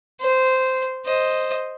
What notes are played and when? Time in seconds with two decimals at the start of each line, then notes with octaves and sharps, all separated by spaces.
0.21 C5
1.06 C5 D#5